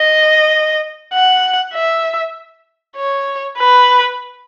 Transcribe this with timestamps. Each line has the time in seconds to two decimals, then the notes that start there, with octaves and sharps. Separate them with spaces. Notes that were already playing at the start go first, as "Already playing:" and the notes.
Already playing: D#5
1.13 F#5
1.74 E5
2.97 C#5
3.59 B4